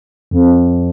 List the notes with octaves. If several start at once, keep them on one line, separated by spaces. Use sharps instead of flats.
F2